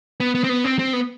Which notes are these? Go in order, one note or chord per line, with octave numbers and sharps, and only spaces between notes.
B3
B3
C4
B3
C4
C4
B3